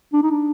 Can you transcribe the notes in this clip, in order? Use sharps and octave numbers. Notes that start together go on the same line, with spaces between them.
D4
D#4
D4